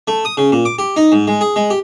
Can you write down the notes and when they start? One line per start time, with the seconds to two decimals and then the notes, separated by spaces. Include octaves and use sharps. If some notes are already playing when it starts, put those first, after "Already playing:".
0.08 A3
0.25 D#6
0.37 C#3
0.52 A#2
0.65 D6
0.79 G4
0.96 D#4
1.12 G#2
1.27 G#3
1.41 G#4
1.56 G#3
1.70 G4